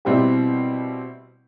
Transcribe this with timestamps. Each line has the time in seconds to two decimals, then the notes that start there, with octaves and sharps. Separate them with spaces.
0.05 B2 G3 C4 E4 G4